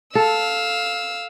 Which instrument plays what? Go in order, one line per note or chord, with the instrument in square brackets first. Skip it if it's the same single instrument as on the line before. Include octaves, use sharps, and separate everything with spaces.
[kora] A4 [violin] F5 E6